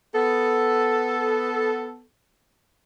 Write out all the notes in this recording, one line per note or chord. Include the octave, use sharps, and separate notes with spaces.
B3 A4